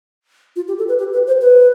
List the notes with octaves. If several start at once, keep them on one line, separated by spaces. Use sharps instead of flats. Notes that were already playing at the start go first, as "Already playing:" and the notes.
F4
G4
A4
B4
G4
B4
C5
B4